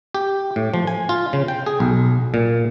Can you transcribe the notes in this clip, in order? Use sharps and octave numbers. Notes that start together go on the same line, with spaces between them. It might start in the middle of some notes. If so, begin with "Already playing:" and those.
G4
A2
F3
G#5
F4
C#3
G5
G#4
B1
A#2